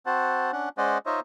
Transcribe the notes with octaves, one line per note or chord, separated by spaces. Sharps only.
C4 F#4 C5 F#5 A5
C#4 D4 F#5
G#3 C#4 C5 D5 D#5 F#5
D#4 F4 C5 C#5 D#5 E5